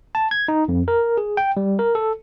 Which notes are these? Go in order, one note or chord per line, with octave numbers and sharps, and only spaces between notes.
A5
G#6
D#4
F2
A#4
G#4
G5
G3
A#4
A4